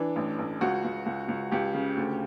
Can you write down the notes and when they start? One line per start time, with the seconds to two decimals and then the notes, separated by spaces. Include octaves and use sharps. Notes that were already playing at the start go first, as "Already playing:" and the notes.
Already playing: E3 D4
0.16 A1
0.39 A1
0.61 C#2 F#4
0.84 C#2
1.06 C#2
1.28 C#2
1.52 C#2 G4
1.75 C#3
1.97 D2